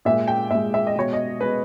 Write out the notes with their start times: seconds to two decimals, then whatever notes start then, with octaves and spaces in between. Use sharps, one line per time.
0.05 A#2 G#3 E5
0.28 G5
0.50 A#2 G#3 E5
0.74 E5
0.87 D#5
0.96 B2 G#3 C#5
1.13 D#5
1.41 B2 G#3 B4